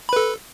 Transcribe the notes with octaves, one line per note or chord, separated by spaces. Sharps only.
A4 B4 B5